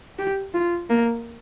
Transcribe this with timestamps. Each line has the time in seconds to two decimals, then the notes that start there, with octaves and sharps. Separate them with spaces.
0.19 G4
0.54 F4
0.90 A#3